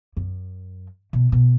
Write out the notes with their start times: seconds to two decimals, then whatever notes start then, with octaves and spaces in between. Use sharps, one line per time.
0.17 F#2
1.13 B2
1.32 B2